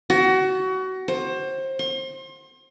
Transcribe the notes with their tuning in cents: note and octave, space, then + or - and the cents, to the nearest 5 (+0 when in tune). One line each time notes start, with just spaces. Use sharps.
F#4 +25
C5 +25
C6 +40